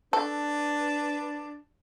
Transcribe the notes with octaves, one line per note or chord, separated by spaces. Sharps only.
D4 A4 B4